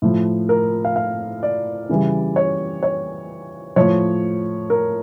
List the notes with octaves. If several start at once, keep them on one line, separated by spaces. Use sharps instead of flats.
A2 F3
A#4
F5
F5
D5
C#3 E3 G3
C#5
C#5
A2 F3 C#5
A#4